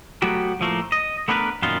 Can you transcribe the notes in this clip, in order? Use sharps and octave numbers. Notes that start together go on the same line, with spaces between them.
F#3 A3 B3 F#4 G4
A2 F3 A3 A#3
D#5
A3 B3 D4 E4 A#4 B4
F#2 A#2 D#3 B3 F4